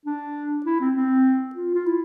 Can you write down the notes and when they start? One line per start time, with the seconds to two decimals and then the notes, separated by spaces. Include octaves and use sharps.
0.06 D4
0.66 E4
0.80 C4
0.96 C4
1.55 F4
1.74 F4
1.86 E4